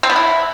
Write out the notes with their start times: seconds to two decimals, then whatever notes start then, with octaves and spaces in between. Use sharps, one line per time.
0.03 C4
0.10 B3
0.16 E4